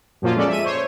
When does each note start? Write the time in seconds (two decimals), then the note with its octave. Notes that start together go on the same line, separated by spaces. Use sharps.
0.22 F#2 A#2 F3 A#3 F4
0.36 G#3 C#4 A4 D5
0.48 E5 D#7
0.64 C5 C#5